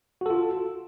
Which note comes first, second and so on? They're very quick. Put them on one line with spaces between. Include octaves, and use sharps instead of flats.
F#4 A4 F4